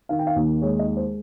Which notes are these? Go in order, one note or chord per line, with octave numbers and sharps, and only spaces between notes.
D#3 F5
G5
F5
D#2
G#3 C#5
D#5
G#3
C5